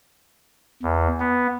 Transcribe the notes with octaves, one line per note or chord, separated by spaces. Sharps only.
E2
B3